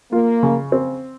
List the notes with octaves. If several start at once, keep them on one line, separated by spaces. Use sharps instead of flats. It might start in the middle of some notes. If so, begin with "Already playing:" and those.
A#3 F4
C#3
C4